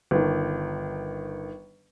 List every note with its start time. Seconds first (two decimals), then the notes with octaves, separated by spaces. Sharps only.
0.11 G1 D#3